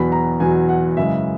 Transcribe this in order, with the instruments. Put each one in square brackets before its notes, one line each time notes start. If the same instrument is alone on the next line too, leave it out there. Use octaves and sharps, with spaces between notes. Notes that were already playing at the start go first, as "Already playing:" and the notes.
Already playing: [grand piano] E2 B2 F#3 B5
A#5
E2 B2 F#3 G#5
F#5
F#2 C#3 E3 G#3 E5